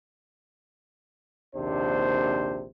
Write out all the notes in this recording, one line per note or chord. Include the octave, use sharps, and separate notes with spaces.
A#1 D#2 C3 D4 C5